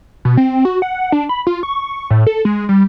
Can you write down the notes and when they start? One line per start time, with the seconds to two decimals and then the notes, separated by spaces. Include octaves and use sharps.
0.25 B2
0.37 C4
0.65 F#4
0.82 F#5
1.12 D4
1.29 B5
1.47 F4
1.63 C#6
2.10 A2
2.27 A4
2.45 G#3
2.69 G3